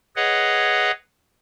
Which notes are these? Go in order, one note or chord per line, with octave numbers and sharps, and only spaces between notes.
G#4 B4 C#5 D#5 F#5